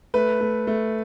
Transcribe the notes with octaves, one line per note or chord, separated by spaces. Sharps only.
A3 B4
A3
A3